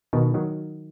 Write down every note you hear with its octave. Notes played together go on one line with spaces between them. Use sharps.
B2 D#3
D#3 F#3